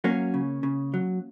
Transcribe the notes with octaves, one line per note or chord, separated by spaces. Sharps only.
F#3 A#3 C#4
C#3
C#3
F#3